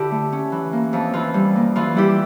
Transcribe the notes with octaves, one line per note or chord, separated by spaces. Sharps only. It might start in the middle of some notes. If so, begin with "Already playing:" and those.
Already playing: D3 E4 G4
A3
C#4
E3
A#3
F2
E3 F4
G3
A#3
E3 F4
G3 E4 G4